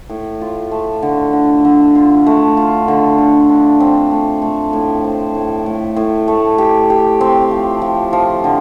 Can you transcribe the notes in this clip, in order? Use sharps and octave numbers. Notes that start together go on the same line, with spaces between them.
A2
F4
A3
D3
D3
D3
F4
A3
F4
D3
D3
D4
C4
A3
A3
A2
C5
A2
A2
A2
A3
G4
G4
C4
F3
F3
F3
D3